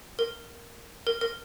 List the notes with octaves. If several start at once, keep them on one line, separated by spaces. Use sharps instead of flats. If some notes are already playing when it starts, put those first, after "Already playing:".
A#4
A#4
A#4